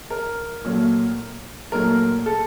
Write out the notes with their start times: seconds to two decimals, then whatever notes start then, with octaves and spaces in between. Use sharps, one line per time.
0.10 A#4
0.64 A#2 F#3 A3
1.72 A#2 F#3 A3 A#4
2.26 A4